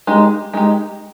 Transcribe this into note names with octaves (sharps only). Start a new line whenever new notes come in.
G#3 D#4 G4
G#3 D#4 G4